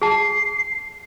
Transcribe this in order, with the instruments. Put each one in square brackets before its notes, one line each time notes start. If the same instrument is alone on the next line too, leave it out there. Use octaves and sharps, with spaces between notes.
[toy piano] G#4 A5 [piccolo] C7